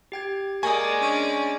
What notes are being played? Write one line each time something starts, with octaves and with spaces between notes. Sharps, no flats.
G4 G5 G#6
G#3 A#3 D5 G#5 C#6 D#6
C#4 D4